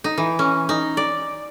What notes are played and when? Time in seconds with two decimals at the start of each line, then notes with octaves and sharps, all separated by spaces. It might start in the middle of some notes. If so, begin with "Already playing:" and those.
0.04 D#4
0.17 E3
0.39 C#4
0.69 D#4
0.97 D5